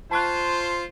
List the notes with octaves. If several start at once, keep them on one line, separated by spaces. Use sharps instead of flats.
F4 C5 A5 C#6 F#6